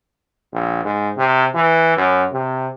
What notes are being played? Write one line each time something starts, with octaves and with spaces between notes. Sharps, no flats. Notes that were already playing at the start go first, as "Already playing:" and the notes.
A#1
G#2
C3
E3
F#2
C3